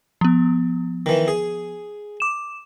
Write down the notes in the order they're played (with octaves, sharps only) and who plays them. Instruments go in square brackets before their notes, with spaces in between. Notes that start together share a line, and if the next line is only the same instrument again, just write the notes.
[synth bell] F3 B3
[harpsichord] D#3 E3
G#4
[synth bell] D6 E7